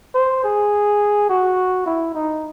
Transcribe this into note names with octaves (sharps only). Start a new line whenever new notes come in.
C5
G#4
F#4
E4
D#4